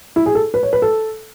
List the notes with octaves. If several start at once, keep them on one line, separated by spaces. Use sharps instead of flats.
E4
G#4
A4
B4
C#5
B4
A4